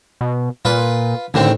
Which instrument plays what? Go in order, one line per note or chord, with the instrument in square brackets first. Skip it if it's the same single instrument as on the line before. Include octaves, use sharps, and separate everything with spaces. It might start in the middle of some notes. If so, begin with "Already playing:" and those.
[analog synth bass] B2
[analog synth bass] A#2 [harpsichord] F4 B4
[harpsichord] A1 D#3 C4 [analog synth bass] D3